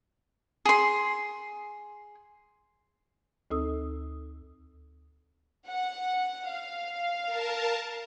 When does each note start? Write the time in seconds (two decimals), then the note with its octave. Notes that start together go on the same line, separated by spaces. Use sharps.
0.65 G#4 C6
3.51 D2 C4 D#4 A4 D#6 E6
5.67 F#5
6.51 F5
7.26 A#4 A5